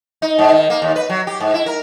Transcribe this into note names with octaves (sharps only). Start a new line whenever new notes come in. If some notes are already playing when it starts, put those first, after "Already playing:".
D#4
G#2
D#3
A#3
D#2
B4
F#3
G4
G#2
E4
A#4